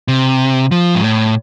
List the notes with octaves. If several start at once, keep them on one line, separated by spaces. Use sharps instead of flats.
C3
F3
G#2
A2